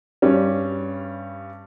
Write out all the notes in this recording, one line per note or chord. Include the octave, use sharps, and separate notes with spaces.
G2 G3 C#4